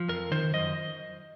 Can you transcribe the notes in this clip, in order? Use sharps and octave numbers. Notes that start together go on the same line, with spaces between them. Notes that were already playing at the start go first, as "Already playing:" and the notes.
Already playing: F3
F2 A#4
D#3 C5
F#2 D#5